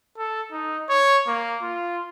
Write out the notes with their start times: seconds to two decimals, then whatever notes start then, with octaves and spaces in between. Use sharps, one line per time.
0.18 A4
0.52 D#4
0.90 C#5
1.28 A#3
1.62 F4